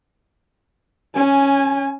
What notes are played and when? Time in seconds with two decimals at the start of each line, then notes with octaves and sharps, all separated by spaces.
1.15 C#4 G#5